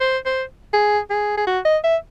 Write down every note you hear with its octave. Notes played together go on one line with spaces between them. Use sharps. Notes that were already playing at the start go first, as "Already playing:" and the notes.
C5
C5
G#4
G#4
G#4
F#4
D#5
E5